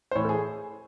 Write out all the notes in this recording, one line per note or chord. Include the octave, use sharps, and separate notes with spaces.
C5
A2 E3 C#5
A4
G#4